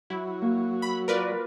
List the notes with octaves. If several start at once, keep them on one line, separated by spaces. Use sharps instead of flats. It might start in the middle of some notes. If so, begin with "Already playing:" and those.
F#3 E4
A#3 F#4
B5 E6
F4 A#4 B4 D5